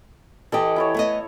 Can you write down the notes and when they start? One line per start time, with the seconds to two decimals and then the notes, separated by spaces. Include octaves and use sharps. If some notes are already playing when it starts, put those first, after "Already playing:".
0.52 E3 G4 A4 D#5
0.76 E4 A4 C#5
0.95 A3 B3 D#5